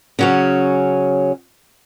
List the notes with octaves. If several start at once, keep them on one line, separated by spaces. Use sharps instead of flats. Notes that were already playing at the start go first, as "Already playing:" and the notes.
C#3 F#3 C#4